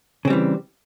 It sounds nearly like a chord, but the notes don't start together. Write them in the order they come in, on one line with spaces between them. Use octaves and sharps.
C#3 C4 G3 E3